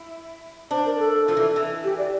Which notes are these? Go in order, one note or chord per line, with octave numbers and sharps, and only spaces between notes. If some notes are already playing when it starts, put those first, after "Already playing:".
Already playing: E4
D4 C5
A#4
A4
F3
E3
E3
G4
D5